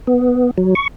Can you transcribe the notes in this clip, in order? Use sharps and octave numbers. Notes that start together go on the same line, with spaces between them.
B3
F#3
C#6